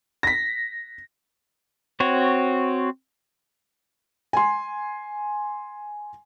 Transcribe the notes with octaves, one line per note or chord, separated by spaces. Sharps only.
A#6 B6
C4 F#4 C#5
G#5 C6